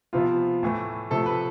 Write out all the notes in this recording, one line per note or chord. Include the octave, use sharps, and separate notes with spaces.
C3 F3 B3 F4
A2 E3 A3
C3 F3 A3 A4
B4